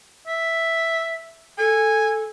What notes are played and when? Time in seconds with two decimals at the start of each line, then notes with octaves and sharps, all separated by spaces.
0.27 E5
1.58 A4 G#5